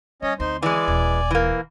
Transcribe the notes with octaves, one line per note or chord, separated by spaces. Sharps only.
G3 C#4 C#5 D#5
D2 C4 D#4 C5 C6
E3 G#3 D5 G#5 D6
D#1
E3 A#3